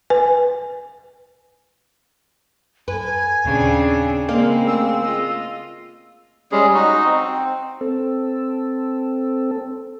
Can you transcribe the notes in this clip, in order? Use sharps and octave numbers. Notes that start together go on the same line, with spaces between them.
B4 G#5
F#2 A4 B4 G#5
D#2 A#2 C#3 C4 D4
C#3 G#3 A#3 C4 A#4 D5 D#5
A3 G#4 F5 E6
F4 D#5
G3 G#3 C#4 G#4
D#4 F#4 D#5
C4
C4 A4